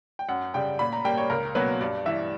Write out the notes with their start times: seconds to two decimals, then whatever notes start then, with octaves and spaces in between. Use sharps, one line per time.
0.19 G5
0.29 F#2 F#5
0.54 C#3 G3 G5
0.79 A#2 B5
0.93 A#5
1.04 G3 A#3 G5
1.18 C#5
1.30 C#2 A#4
1.55 B2 F#3 A#3 B4
1.81 G2 D5
2.06 E3 G3 E5